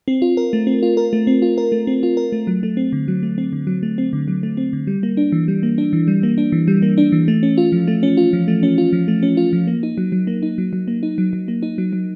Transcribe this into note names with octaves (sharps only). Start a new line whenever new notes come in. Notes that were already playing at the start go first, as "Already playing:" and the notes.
C4
F4
A#4
A3
C4
F4
A#4
A3
C4
F4
A#4
A3
C4
F4
A#4
A3
F#3
A3
C4
D3
F#3
A3
C4
D3
F#3
A3
C4
D3
F#3
A3
C4
D3
G3
A#3
D4
E3
G3
A#3
D4
E3
G3
A#3
D4
E3
G3
A#3
D4
E3
A3
C#4
F4
F3
A3
C#4
F4
F3
A3
C#4
F4
F3
A3
C#4
F4
F3
A#3
D#4
F#3
F#3
A#3
D#4
F#3
F#3
A#3
D#4
F#3
F#3
A#3
D#4
F#3
F#3